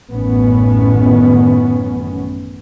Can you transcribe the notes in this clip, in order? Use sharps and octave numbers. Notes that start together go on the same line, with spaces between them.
A1 F#2 A2 D#3 B3 C#4